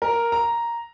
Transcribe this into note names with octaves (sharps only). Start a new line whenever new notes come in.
A#4
A#5